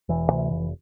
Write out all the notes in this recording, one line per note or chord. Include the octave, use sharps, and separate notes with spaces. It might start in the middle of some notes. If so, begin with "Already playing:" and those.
E1 E3
D2 C3
F1